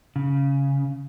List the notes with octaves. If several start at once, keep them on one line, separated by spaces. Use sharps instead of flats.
C#3